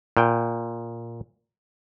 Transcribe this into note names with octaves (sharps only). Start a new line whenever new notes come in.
A#2 G5